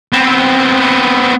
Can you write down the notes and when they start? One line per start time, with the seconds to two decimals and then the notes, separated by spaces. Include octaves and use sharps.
0.13 B3 C4